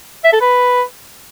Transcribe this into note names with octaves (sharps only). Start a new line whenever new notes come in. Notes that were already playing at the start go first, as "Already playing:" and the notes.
E5
A4
B4